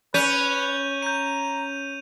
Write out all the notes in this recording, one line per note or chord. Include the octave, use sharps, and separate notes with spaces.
C#4 B4 G6 D#7 F7
A#5 G6 D#7